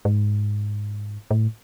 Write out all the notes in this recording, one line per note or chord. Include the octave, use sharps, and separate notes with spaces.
G#2
A2